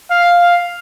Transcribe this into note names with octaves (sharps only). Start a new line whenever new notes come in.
F5